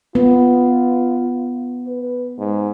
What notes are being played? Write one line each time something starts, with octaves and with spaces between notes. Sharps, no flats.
B3 F4
B4
G#2